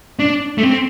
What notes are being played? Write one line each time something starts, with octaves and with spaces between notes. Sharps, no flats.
D4
A3
C4